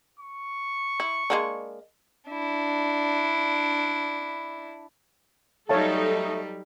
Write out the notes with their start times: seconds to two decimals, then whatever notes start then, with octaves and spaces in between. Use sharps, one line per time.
0.20 C#6
1.00 E4
1.30 G#3 A#3 D4
2.29 D4 E4
5.69 F#3 G3 A3 D#4 A4 C#5 F5 A5